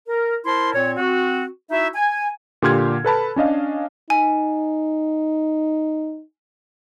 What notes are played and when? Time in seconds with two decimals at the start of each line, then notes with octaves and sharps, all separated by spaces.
0.08 A#4
0.45 E4 A#4 C5 A5 C6
0.75 A#2 C4 C#5
0.97 C4 F#4
1.70 D#4 E4 F#4 E5
1.95 G#5
2.62 A#2 D3 G4 C6 F6 G#6
3.05 A4 B4 A5 B5
3.36 C#4 D4 D#5 F5
4.10 D#4 G#5